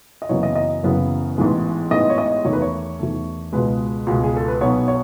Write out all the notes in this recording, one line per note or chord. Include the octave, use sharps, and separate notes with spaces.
D#5
F#1 F#2 C#3 E3 B3 C#5
D#5
D#5
F#1 F#2 C#3 E3 B3
A1 G#2 E3 G#3 B3
A1 G#2 E3 G#3 B3 D#5
C#5
D#5
E2 D#3 A3 C#5
B4
C#5
E2 D#3 A3
C#2 B2 G#3 B4
C#2 B2 G#3
G#4
A4
B4
B1 B2 F#3 B3 C#5
C#5